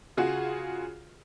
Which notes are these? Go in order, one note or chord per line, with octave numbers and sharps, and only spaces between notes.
C#3 F4 F#4 G#4